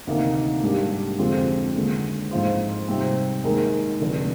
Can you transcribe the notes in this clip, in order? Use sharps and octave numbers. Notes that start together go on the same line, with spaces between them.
D2 C3 D#3 A#3 D#4
G#2 G3 A#3 D4 G4
F2 D3 G#3 C4 F4
D#2 D3 G#3
G#2 F3 C4 F4 C5
C3 G3 C4 D#4
D#2 D#3 G#3 D#4 A#4
F1 F2 D3